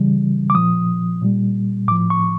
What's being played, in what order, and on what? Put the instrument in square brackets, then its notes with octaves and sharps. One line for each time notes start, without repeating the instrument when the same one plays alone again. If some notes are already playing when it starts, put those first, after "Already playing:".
Already playing: [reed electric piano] C#3 E3 G3
D6
A#2 F3 D#6
A#2 G3
A2 D6
F3
C#6